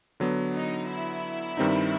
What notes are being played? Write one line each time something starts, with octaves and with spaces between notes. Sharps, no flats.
D3 F#3 B3
D#4
E4
G2 D#3 G3 C4 D#4